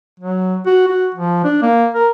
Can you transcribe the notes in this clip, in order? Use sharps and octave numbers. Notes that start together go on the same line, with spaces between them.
F#3
F#4
F#4
F3
D4
A#3
A#4